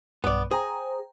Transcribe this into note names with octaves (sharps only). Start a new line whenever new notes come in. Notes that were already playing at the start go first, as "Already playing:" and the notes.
B1 G2 B3 D5
G#4 C5 G5 A#5